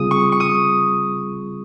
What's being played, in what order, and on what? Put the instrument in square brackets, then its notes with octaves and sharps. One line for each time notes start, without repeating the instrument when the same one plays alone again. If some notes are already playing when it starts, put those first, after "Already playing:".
Already playing: [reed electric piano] C#3 G3 C4 F4 G#4 [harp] D#6
[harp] C#6
C#6
D#6